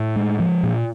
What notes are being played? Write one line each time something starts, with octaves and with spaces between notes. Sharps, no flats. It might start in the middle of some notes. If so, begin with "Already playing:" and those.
Already playing: A2
G#3
F3
A#2